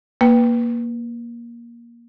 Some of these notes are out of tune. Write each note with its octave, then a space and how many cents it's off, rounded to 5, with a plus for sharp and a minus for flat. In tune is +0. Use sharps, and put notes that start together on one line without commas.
A#3 +15 B4 +0 G5 +0